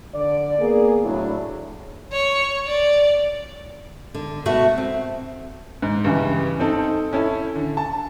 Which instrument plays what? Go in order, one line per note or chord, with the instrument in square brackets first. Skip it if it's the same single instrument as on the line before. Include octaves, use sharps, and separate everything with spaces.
[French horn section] D3 D5
A#3 B3 G#4
A2 F#3 D4 E4
[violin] C#5
D5
[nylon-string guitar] D3
B2 A3 F#4 B4 E5 F#5
C4
[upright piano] G#2
G2 C#3 E3
C4 D#4 A4
C#4 E4 A4
D3
A5